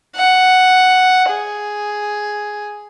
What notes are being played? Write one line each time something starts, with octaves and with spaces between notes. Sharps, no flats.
F#5
G#4